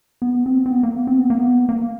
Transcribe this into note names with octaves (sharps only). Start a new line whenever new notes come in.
B3
C4
C4
B3
A#3
B3
C4
B3
A#3
B3
A#3